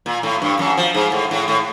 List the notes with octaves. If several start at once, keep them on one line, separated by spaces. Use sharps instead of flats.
A#2
A2
G2
F#2
F3
G#2
A2
A2
A2